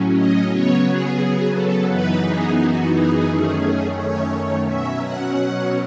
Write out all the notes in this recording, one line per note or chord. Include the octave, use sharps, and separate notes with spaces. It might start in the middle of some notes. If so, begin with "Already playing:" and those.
Already playing: A2 F#3 C#4
D#5
C#3 F#3 B3 C#5
G#4
A4
F#2 E3 B3 D#4 B4
G#4
F#4
G#4
F#2 D#3 A3 C#4
C#5
B2 F#3 C#4 E5
F#5